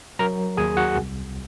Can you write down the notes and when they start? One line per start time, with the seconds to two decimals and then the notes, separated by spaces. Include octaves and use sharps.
0.19 F#3 A#4 A#5
0.57 D#2 G#4 G#5
0.77 F#4 F#5
0.96 C2